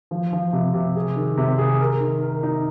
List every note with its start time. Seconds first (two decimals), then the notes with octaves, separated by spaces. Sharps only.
0.11 F3
0.33 F3
0.53 C3
0.74 C3
0.96 G#4
1.16 D#3
1.37 C3
1.58 G#4
1.80 A#4
2.00 D#3
2.22 A#4
2.43 D#4